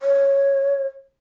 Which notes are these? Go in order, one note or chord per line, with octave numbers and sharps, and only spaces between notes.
C#5